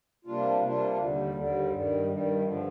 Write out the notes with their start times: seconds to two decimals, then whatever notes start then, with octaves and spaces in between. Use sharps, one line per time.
0.25 C3 G3 A#3 D4 F4
0.62 C3 G3 A#3 D4 F4
0.98 D#2 D3 G3
1.35 D#2 D3 G3
1.70 G2 D#3 G3
2.07 G2 D#3 G3
2.42 G2 D3 F3